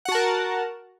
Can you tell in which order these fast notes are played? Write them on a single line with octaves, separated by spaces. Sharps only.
F#5 F#4 A5 A#4